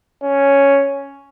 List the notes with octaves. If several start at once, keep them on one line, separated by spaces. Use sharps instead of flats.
C#4